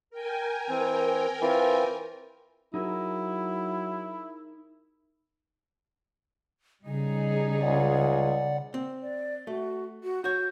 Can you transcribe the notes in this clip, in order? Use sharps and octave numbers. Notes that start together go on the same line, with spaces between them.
A#4 G5 G#5
E3 C4
E3 C4 F4
F#3 D#4 E4 G#4 A#4
C#3 G3 D#4 G#4
C#2 D5 F#5
C4
D5
A3 F#4
F#4
F#4 C#5 G6